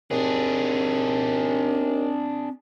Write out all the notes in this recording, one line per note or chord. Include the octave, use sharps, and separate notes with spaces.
D#2 C4 D4 G#4